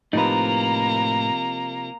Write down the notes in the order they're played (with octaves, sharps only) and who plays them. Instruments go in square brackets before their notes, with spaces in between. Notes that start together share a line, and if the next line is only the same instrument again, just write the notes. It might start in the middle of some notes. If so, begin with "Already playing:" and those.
[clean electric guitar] A2 B4 [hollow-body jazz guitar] C3 F3 D#4 [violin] A#3 A#5